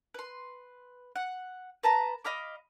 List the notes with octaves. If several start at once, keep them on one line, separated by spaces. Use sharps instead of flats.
B4 C6
F#5
B4 A5 A#5
D#5 F5 B5 D6